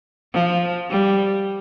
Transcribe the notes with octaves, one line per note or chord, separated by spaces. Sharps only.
F3
G3